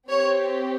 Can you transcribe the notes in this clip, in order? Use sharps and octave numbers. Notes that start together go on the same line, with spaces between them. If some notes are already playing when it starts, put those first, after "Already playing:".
C4 G4 C#5